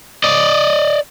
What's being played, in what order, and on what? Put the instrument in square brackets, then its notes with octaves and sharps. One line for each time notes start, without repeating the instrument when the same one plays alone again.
[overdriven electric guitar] D5 D#5